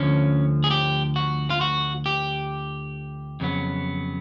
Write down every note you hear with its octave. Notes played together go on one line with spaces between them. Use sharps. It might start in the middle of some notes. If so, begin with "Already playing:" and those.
Already playing: D2 D3 F3 C#4
G#4
G4
F#4
F4
F#4
G4
F2 C#3 F#3 B3